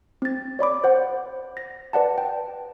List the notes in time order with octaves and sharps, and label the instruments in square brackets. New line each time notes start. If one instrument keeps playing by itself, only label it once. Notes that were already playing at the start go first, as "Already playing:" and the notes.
[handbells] C4 A6
C#5 D5 B5 D6
C5 F#5
A#6
B4 D5 F#5 A5
G5